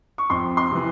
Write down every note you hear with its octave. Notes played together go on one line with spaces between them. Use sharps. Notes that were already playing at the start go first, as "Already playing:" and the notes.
C#6
F2 C6
C6
C3 E3